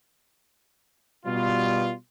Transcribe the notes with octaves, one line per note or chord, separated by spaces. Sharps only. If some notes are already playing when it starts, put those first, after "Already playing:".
B2 G3 F4